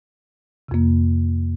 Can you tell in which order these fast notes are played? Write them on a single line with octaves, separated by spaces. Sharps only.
C3 F2 A#3